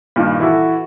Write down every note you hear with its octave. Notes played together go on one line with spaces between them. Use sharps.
G2 A#2 D#3
E3 E4 F#4 A4